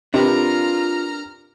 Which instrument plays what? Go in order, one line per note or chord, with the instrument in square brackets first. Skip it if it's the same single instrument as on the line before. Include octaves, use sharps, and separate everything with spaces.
[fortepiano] C3 [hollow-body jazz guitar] D4 A#4 B4 [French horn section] F4 [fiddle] A#5 F6